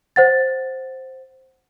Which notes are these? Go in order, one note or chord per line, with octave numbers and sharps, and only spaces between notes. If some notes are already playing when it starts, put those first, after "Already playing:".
C5 F#5 A6